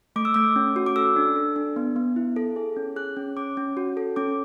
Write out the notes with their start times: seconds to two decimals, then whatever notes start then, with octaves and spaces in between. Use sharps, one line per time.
0.16 A3 D6
0.25 E6
0.34 A3 D6
0.56 C#4
0.76 F#4
0.86 D6
0.96 A4 E6
1.16 D4
1.36 A4
1.56 D4
1.76 B3
1.96 B3
2.16 E4
2.36 A4
2.56 G#4
2.76 C#4
2.96 G#4 F#6
3.17 C#4
3.37 C#4 D6
3.57 C#4
3.77 F#4
3.97 A4
4.16 C#4 D6